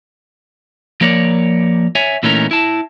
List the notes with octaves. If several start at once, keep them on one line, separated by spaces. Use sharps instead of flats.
F3 A#3 A#4 C#5 D5
C#5 E5 G#5
A#2 E3 A3 C#4 D#4 A#4
E4 A5